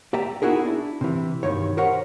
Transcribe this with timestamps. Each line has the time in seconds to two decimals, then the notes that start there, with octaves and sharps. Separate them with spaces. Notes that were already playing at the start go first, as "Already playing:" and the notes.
0.13 G4 D5 E5 G5 A#5
0.42 B3 D#4 E4 F#4 G#4 A#4
0.65 D4 E4
1.01 C3 E3
1.43 B1 G2 D#3 C#5
1.77 G4 A#4 C5 C#5 D#5 F#5